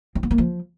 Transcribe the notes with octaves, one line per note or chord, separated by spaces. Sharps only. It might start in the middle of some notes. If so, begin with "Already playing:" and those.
C4
B3
A#3
F3